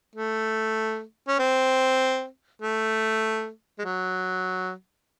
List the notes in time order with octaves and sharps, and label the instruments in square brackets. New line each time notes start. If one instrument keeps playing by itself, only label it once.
[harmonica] A3
C#4
C4
A3
G#3
F#3